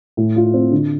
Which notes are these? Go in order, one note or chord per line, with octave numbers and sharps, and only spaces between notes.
A2
F4
C4
D3